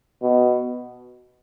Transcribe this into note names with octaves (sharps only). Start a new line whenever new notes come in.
B2